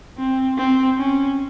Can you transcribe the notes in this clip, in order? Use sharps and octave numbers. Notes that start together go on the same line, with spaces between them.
C4
C4
C#4